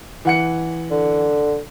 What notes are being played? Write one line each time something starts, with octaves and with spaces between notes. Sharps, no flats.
E3 F#5 C#7
D3